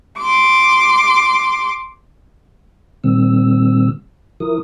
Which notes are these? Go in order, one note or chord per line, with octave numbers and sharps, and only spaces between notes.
C6 D6
A#2 D#3 G3 C4 E6
F3 E4 A#4 D#6